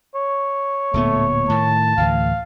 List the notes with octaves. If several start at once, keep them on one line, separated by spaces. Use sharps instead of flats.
C#5
D1 A#2 A3 B3
A2 D#3 A5
D2 A2 E3 F5